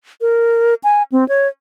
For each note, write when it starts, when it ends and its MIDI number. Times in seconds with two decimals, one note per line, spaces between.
0.21 0.74 70
0.84 1.03 80
1.12 1.27 60
1.29 1.48 73